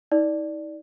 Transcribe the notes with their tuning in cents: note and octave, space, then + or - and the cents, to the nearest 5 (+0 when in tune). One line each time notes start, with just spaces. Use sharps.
D#4 +45 D5 +5